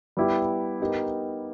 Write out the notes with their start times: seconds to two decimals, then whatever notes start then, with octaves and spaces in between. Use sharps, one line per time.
0.17 G3 B3 E4 G4
0.80 B3 D#4 G4 A#4